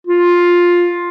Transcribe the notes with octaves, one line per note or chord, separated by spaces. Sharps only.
F4